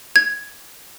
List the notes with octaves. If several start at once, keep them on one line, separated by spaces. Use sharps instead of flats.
G#6